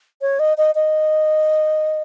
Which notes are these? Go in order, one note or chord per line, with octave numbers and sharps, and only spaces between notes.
C#5
D#5
D#5
D#5